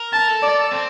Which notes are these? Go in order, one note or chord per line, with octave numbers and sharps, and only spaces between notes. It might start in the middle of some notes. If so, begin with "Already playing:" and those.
Already playing: A#4
A5
A4
D5
C4